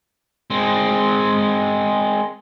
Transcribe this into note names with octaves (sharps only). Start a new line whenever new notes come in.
G#3 C4